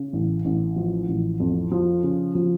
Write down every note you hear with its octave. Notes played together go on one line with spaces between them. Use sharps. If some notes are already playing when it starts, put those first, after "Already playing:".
Already playing: C#3
A1
A1
F3
A1
F2
F3
C#3
F3